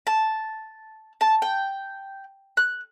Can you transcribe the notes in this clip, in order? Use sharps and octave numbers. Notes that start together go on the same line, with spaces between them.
A5
A5
G5
F#6